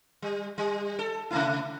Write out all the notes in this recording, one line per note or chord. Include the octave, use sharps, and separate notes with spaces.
G3
G3
A4
C3 A3 E4